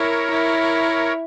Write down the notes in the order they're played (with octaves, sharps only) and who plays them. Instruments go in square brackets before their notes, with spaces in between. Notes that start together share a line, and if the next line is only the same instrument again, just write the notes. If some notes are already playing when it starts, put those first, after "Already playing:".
Already playing: [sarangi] E4 [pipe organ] A#4 C#5
[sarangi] E4